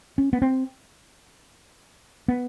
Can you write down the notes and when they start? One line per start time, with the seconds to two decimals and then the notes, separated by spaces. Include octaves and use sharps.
0.18 C#4
0.33 B3
0.42 C4
2.28 B3